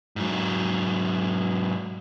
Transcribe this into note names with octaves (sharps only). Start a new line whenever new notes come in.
G#2 F#3